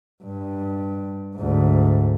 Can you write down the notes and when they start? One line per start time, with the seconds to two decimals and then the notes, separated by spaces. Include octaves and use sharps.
0.24 G2
1.36 D2 G#2